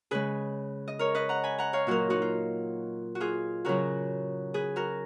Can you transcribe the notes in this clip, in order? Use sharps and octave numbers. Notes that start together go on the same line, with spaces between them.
C#3 G#3 G#4 B4
D#5
A#4 C#5
B4 D#5
F#5 A#5
G#5 B5
F#5 A#5
C#5 F5
A#2 F#3 F#4 A#4
D#4 F#4
F4
F#4
F4 G#4
C#3 F#3 F#4 A#4
G#4 B4
F#4 A#4